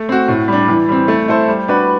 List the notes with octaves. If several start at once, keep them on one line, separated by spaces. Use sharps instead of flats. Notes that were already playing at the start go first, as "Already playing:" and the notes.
Already playing: A3
C4 F#4
A2
G3 D4
E3
G3 C4
A3
E4 A4 C5
G3
D4 F#4 B4